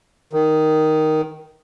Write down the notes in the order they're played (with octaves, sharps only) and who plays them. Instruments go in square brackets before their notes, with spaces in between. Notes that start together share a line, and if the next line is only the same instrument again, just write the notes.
[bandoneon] D#3